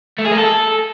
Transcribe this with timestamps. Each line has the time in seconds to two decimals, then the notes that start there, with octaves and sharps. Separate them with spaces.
0.18 A3
0.25 G#4
0.31 A#3
0.38 A4